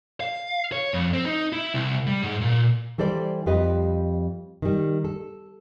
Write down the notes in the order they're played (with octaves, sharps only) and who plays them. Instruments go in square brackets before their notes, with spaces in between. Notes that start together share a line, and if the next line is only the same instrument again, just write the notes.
[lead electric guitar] F5
C#5
F2
C4
D#4
E4
C2
G3
G#2
A#2
[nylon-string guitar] E3 G3 A4 C5 D5
F2 F3 G3 G4 B4 D#5
D#3 G3
A4